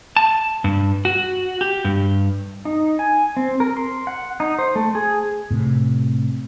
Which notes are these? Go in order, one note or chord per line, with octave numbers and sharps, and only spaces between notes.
A5
G2
F#4
G4
G2
D#4
G#5
C4
A#4
C6
F#5
D#4
C5
A3
G#4
A2 C3